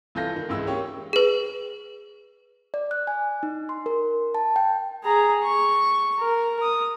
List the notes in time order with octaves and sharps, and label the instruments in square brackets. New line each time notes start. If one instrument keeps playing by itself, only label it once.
[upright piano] C2 E3 F4 A4 G6 A#6
D#3
C#2 G#2 E3 E6
A#3 C#4 G4 C#5
[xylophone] G#4 B4
[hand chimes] D5
F#6
G#5
D#4
C6
A#4
A5
G5
[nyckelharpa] G#4 A#5
C#6
A#4
D#6